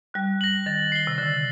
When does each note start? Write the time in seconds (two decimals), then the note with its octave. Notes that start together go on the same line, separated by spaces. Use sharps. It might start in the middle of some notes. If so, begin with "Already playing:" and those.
0.14 G3 F#6
0.41 A#6 F#7
0.66 D#3 A6
0.92 C7 G7
1.07 C3
1.18 D3 A6